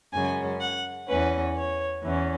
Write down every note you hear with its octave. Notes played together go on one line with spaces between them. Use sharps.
F#2 C#3 G#3 C#4 G#5
F#5
E2 E3 C#4 B4
C#5
E2 E3 C#4